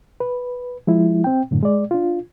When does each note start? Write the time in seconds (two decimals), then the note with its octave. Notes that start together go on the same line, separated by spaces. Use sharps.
0.20 B4
0.87 F3 G#3 E4
1.24 C4 G5
1.51 F#2 A2 D3
1.63 G#3 D5
1.91 D4 F4